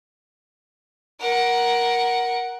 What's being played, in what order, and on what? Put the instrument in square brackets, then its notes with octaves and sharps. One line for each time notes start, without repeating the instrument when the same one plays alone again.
[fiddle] A#4 F#5